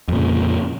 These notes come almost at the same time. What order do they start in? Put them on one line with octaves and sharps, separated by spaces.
F2 A#2 C#3